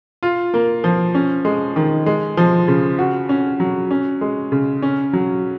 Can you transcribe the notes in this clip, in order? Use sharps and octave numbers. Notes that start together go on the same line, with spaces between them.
F4
A#3
F3
C#4
G#3
D#3
G#3
F3
C#3
F#4
C#4
F#3
C#4
G#3
C#3
C#4
F#3